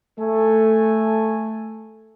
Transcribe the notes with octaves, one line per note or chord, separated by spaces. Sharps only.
A3 A4 G#5